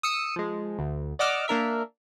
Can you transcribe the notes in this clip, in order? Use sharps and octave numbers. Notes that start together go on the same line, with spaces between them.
D#6 E6 C#7
F3 G#3
D2
D5 D#5 F#5 D6 E6 F6
A#3 D4 A#4 E5